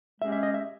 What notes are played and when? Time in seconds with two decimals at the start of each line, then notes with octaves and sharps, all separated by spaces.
0.21 G#3 C#4 G4 E5
0.32 E5
0.43 D#5
0.54 E5